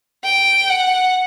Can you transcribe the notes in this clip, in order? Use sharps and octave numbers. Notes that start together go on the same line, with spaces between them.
G5
F#5